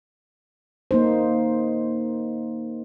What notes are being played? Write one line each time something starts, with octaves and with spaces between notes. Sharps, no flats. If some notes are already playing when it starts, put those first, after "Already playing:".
A#3 D#4 C5